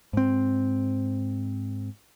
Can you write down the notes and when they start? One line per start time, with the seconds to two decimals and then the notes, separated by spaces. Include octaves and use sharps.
0.13 G#2 C4